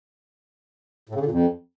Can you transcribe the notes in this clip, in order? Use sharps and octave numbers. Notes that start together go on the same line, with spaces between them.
A2
C#3
D3
A#2
F2